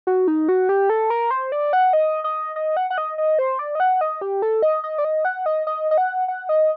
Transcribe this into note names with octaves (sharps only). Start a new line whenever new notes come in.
F#4
D#4
F#4
G4
A4
A#4
C5
D5
F#5
D#5
D#5
D#5
F#5
F#5
D#5
D#5
C5
D5
D#5
F#5
D#5
G4
A4
D#5
D#5
D5
D#5
F#5
D#5
D#5
D#5
F#5
F#5
D#5